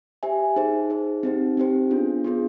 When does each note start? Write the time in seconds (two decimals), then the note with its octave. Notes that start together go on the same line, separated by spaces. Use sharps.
0.23 G4 C5 E5 G#5
0.56 D#4 G#4 C5
0.90 D#4 G#4 C5
1.23 C4 D#4 G4 C5
1.57 C4 D#4 G4 C5
1.91 B3 D4 F4 G#4
2.24 B3 D4 F4 G#4